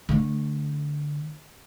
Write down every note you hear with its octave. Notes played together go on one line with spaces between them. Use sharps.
D3 A3